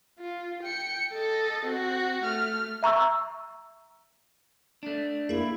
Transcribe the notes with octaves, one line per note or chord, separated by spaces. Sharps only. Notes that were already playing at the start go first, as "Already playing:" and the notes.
F4
G5 C#7
A4 D#5
C4 F#4
A3 F6
E5 A#5 C#6 E6
A3 D4
A#3 E4 G#4 A#4